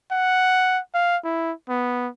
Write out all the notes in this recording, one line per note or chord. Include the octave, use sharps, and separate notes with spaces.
F#5
F5
E4
B3